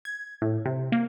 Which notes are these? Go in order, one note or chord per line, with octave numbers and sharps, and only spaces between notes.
G#6
A2
C3
A#3